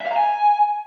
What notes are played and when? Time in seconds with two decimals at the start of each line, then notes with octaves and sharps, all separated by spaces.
0.01 E5
0.06 F5
0.11 A#5
0.16 G#5